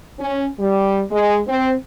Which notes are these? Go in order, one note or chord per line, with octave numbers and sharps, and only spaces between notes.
C#4
G3
G#3
C4